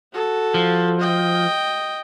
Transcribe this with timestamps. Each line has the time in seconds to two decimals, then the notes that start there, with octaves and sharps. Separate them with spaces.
0.13 F#4 A4
0.54 F3
1.00 D#5 G5